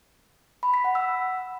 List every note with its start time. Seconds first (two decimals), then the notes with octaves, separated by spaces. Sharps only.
0.63 B5
0.74 B6
0.84 F#5
0.95 E6